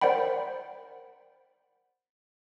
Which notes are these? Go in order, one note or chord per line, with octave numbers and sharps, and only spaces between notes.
A#4 C5 D5 F#5 G5 B5